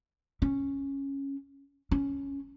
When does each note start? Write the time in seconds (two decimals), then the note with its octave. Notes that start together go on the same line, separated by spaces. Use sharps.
0.42 C#4
1.91 C#4